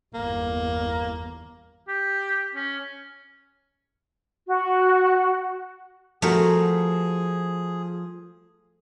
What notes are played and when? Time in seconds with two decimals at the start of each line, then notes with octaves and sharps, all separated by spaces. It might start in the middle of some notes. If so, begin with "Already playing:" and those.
0.14 G1 E2 A#3
1.88 G4
2.55 C#4
4.48 F#4
6.22 F3 A3 F#4 G#4 A#4